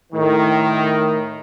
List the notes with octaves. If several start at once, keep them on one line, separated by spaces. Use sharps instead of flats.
A2 D#3